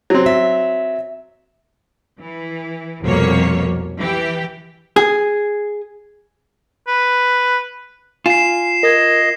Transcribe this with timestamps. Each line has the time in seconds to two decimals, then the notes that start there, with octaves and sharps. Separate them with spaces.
0.10 F#3 C4
0.26 E5
2.18 E3
3.03 C2 F2 B2 A#3 C#5
3.99 E3 G4
4.96 G#4
6.87 B4
8.26 F4 G#5 C7 E7
8.83 A#4 D#5 G#6